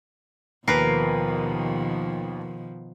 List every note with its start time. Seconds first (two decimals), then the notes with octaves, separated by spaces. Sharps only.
0.68 D#2 B2 D#3 F3 A#4 B4 C7